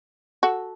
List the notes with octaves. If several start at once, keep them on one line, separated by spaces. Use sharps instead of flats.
F#4 A4